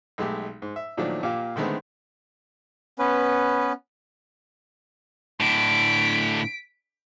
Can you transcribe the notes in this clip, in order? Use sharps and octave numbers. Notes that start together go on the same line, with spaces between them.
B1 G#3 A3 G4
G#2
E5
A#2 D#3 F3 F#3 A3 D4
A#2 A#3 F4 G4 F5
D3 D#3 G#3 A3 B3 C4
B3 C#4 B4
A2 D3 B6 D7